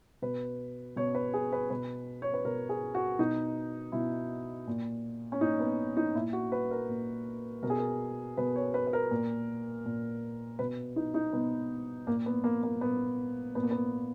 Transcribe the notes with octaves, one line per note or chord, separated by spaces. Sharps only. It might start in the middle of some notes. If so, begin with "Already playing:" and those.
B2 B4
B2 C#5
B4
G#4
B4
B2 B4
C#5
B4
B2 A#4
G#4
F#4
B2 D#4
B2 E4
A#2
C#4
A#2 D#4
B3
D#4
A#2 E4
F#4
B4
A#4
A#2
B2 A#4
G#4
A#4
B2 B4
C#5
B4
B4
A#4
A#2
A#2
B2 B4
D#4
D#4
B2 B3
A#2 A#3
B3
A#3
A#3
A#2 B3
A#2 B3
A#3
B3